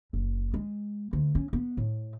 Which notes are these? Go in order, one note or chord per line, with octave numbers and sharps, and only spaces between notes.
F#1
G#3
D2
C#4
B3
A2